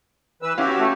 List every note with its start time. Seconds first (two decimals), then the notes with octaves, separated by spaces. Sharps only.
0.42 E3 B4 E6
0.58 C#4 E4 F#4 G4 F5
0.80 A3